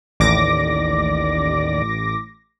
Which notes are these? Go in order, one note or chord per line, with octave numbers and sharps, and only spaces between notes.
A1 D#2 D5 D6 A#6